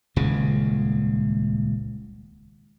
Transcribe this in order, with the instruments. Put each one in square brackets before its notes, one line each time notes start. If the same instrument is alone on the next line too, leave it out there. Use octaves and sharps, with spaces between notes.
[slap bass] D#1 C#2 C#3 G#3